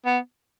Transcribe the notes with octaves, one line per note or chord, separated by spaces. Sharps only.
B3